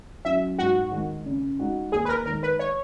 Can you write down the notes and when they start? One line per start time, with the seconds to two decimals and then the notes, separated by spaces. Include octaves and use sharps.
0.25 F#3 C#4 E5
0.59 G#2 F#4
0.92 D#3 G#3 D#4
1.25 C#3
1.59 G#3 D#4 F#4
1.92 D#2 G#4
2.05 B4
2.09 A#4
2.26 D#3 G#3 A#4
2.43 B4
2.59 C#5